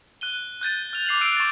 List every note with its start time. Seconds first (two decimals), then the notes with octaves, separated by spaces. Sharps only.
0.21 F#6 D#7 G7
0.61 F#6 G6 A6 D#7
0.93 F6 F7
1.06 D6 C7 F7 F#7
1.21 E6 F#6 C7 D7 D#7
1.37 C#6 A6